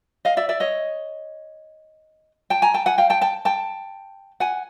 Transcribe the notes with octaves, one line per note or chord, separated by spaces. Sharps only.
D#5 F5
D5 E5
D5 E5
C#5 D#5
G5 A5
G#5 A#5
G5 A5
F#5 G#5
F5 G5
G5 A5
G5 A5
G5 A5
F#5 G#5